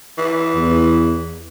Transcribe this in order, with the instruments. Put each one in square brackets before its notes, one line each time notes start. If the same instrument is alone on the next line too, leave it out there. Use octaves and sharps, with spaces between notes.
[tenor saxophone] E3
[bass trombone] E2